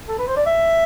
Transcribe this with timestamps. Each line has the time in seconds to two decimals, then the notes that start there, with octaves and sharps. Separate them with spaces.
0.08 A4
0.18 B4
0.27 C5
0.36 D5
0.46 E5